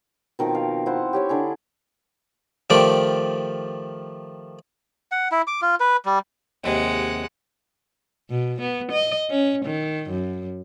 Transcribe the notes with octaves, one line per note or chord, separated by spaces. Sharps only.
B2 D#3 F3 C4
F5
E4 C5 F#5
G4 C#5 G5
D3 E4 G#4
D#3 F3 A3 G4 D5
F#5
E4
D6
F4
B4
G3
D#2 C3 G#3 F#5
B2
B3
D#5
C#4
D#3
F#2